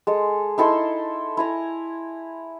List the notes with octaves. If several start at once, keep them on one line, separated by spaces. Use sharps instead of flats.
G#3 A4
D#4 E4 A4 C6
E4 G#5 A#5